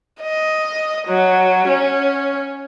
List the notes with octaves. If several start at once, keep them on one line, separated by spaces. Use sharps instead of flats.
D#5
F#3
C#4